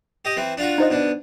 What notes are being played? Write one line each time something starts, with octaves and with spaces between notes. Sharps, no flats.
G4 D#5
E3 C4
D4 F4 F#4
D#4 C5 D#5
B2 D4